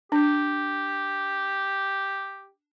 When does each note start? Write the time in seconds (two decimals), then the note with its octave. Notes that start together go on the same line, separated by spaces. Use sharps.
0.12 D4 G4